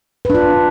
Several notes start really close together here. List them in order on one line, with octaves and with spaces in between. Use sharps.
B4 D4 F4